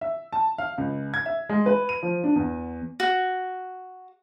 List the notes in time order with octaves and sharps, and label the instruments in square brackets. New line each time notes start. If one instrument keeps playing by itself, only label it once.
[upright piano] E5
A5
F5
C#2
G#6
E5
G#3
B4
D#7
F3
D4
E2
[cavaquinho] F#4